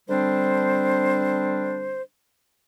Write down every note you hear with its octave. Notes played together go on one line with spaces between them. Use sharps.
D3 G3 C4 D4 C5